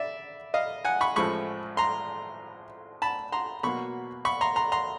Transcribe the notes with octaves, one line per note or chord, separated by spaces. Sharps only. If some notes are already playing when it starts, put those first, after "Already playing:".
Already playing: D5 E5
D#5 F5
F#5 G#5
B5 C#6
A1 A2 F3 G#3 B5 C#6
A#5 C6
A5 B5
A#5 C6
B2 F#3 A#3 B5 C#6
B5 C#6
A#5 C6
A#5 C6
A#5 C6